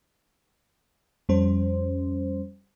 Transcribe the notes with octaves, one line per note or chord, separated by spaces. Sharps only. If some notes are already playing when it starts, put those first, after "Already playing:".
F2 G3 C#4 C5